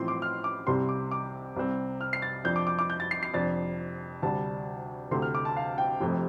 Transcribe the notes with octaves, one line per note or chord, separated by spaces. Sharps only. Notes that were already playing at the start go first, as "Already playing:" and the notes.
Already playing: A1 A2 F3 C4 C6
D6
F6
D6
C2 C3 G3 C4 C6
D6
D6
C2 C3 G3 C4
F6
C7
A6
F2 F3 D4 G6
D6
D6
D6
G6
A6
C7
C7
F1 F2 F3 D4 A6
D2 C3 G3 D4 A5
D2 C3 A3 C6
F6
D6
A5
F5
G5
F1 F2 C3 A3